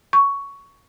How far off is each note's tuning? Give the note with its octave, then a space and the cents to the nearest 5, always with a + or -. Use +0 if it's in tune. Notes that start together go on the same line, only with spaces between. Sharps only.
C#6 +10